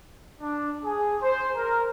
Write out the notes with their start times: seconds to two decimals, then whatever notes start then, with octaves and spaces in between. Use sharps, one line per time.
0.41 D4
0.85 G#4
1.22 C5
1.55 A#4